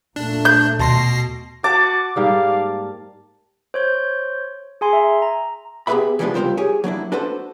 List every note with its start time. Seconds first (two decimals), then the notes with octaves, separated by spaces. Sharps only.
0.16 A#2 A3 D4
0.45 G6
0.79 D#2 B2 A5 C6 A#6 C7
1.64 F#4 A5 D6
2.16 G#2 G3 A#3 F5
3.74 C5 C#5 G6
4.81 G#4 G#5 C6
4.93 E5 A#5
5.22 A#5
5.87 B3 G4 G#4 B4 E5 B5
6.19 E3 F3 G3 G#3 B3 D4
6.35 C#2 G3 C4 F4 A#4 C5
6.57 G4 G#4 C#5
6.84 F#3 A#3 D4 E4
7.12 D4 F#4 A4 B4 C5